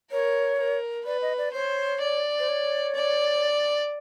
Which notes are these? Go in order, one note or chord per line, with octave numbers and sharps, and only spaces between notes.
A#4 C#5
A#4
B4 D5
D#5
D5
C5 C#5
D5
C5
C#5
D5